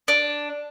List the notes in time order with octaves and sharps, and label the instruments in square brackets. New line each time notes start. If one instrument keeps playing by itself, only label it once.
[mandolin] D4